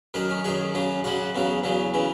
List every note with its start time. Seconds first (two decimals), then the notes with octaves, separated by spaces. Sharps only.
0.14 F#2 D#3 F#3 A#4
0.30 C#4
0.44 F#2 D#3 F#3 G#4
0.74 F#2 C#3 F#3
1.04 F#2 C#3 F#3 F#4
1.35 E2 C#3 F#3
1.64 E2 C#3 F#3
1.94 C#3 E3